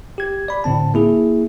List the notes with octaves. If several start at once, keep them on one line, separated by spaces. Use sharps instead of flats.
G4 G#6
D5 B5
A2 D3 C4 A5
A#3 E4 G#4